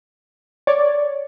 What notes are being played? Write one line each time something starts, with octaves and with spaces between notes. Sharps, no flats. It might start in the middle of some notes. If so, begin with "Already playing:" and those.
C#5 D5